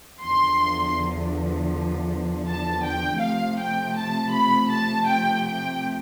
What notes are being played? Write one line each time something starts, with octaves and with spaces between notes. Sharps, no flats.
E2 D3 F3 C6
A5
G5
C3 F3 A3 F5
G5
A5
B5
A5
G5
G5